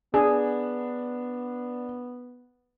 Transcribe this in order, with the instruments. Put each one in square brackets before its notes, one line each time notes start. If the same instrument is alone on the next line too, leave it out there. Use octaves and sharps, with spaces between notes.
[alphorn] B3 [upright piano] D4 [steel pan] G#4